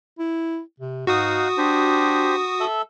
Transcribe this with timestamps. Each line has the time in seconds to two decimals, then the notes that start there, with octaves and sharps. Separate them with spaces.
0.19 E4
0.80 C3
1.07 G#2 D#4 F#4 F5 F#5 D#6
1.58 D4 G4 C5
2.60 A4 E5